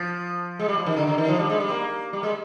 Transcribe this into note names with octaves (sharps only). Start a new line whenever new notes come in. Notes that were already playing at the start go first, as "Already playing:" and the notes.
Already playing: F3
G#3
G3
F3
D#3
D3
D3
D#3
F3
G3
G#3
G3
A#3
G3
G#3